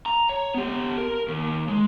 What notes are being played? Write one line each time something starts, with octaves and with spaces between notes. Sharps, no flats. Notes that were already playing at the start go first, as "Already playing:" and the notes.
A#5
C#5
B3 G4
A#4
D#2
G#3